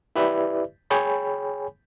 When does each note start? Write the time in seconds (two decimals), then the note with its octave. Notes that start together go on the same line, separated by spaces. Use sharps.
0.16 E4 G4 B4 D5 E5
0.90 G#4 C#5 G5 G#5 B5